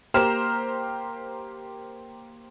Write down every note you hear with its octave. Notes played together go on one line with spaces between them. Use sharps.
A#3 G4 C5 A#5 F6 E7